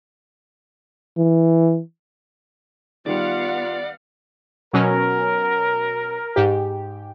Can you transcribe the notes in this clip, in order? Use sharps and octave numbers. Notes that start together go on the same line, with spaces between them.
E3
D#3 G3 B3 F4 D5 F5 F#5
B2 F#3 C#4 A#4
G#2 G4